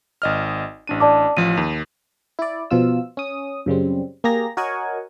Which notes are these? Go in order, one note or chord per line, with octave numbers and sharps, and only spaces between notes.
G#1 D#5 F6
A1 D4 D#7
D5 A5 D6
A1 F3 D#7
D#2
E4 D5
B2 F3 F4 E6
C#4 D#6
F#2 C#3 G3 C4
A#3 G4 G#4 A#5 A#6
F#4 A#4 C#5 D#5 F#5 G#5